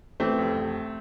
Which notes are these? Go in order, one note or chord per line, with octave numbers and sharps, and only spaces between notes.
E3 A3 C4
F1
F1